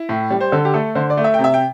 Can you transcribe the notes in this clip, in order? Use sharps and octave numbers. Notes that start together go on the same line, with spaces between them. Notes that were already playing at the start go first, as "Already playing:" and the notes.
Already playing: E4
A2
G3
C5
D3 A4
G4
A3 A4
D3 C5
D5
A3
E5
G5
C3
E5
G5